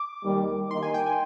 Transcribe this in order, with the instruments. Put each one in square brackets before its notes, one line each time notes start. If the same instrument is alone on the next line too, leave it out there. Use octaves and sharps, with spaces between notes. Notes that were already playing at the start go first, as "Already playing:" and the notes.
Already playing: [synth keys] D6
[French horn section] D#2 D#3 G3
[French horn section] D#3 A#3 D#4 [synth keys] C6
[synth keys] G#5
G5
G#5